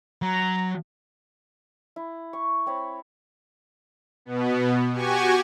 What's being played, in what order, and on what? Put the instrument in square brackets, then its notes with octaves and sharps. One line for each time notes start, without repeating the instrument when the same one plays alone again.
[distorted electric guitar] F#3 [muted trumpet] A#5
[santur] E4
C#6
C4 C#5 B5
[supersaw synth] B2 B3
F#4 G4 G#5 C#6